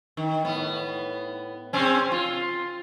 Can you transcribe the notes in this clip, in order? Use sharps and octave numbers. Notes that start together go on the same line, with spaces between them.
D#3
A2 B3
C3 C4 C#4
F4